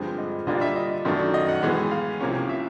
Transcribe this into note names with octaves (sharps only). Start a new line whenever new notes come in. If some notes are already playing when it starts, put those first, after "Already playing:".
Already playing: G2 D3 F3 G#3 C4
D#5
D3 G3 A#3 D4 F4 D#5
E5
D#5
F#2 D#3 F#3 A3 D4
D#5
F#5
A2 E3 G#3 B3
F5
C2 C3 F3 A#3 C#4
E5